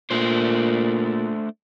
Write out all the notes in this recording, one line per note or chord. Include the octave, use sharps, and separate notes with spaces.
A#2 A3 D4 C5